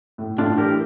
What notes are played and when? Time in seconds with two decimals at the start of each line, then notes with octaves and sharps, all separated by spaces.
0.18 A2
0.38 A2 D4 F4
0.58 E3 G4 A#4